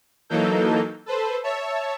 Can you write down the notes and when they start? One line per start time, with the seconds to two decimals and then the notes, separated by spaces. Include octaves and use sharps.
0.29 E3 F#3 A#3 D#4 A4 G6
1.06 A4 B4 C5
1.43 C#5 E5 A5